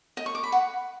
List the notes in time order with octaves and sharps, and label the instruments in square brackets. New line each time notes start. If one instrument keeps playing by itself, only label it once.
[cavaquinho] D#5
C#6
D6
B5
F#5